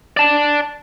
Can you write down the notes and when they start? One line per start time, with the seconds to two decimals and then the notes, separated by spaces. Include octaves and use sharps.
0.17 D5 A5